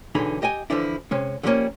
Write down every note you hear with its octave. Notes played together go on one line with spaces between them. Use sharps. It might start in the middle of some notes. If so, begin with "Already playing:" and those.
B1 D3 E3 D#4 G#4 B5
G4 D#5 G5 G#5
D3 E3 F3 D4 E4
C3 G#3 C#4
D3 F3 G3 A3 A#3 C#4